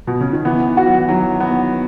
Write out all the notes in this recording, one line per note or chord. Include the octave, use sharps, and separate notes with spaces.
B2
C#3
D#3
E3 B3
F#4
F#3
E3
D#3 F#3
B3